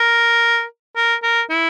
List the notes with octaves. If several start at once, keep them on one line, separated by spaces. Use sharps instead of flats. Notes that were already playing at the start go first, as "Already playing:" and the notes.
Already playing: A#4
A#4
A#4
E4